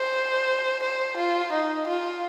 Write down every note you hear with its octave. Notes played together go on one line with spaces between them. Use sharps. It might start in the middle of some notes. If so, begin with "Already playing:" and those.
Already playing: C5
C5
F4
D#4
F4